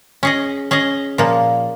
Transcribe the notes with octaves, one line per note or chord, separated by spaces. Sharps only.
C#4 G#4 D#5
C#4 G#4 D#5
A#2 F3 A#3